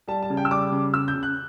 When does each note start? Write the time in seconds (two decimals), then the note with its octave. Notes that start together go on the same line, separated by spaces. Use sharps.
0.08 G3 A5
0.22 A5
0.30 C#3
0.37 G5
0.45 E6
0.50 G3 D6
0.72 C#3
0.94 C#3 E6
1.08 G6
1.15 C#3
1.23 F#6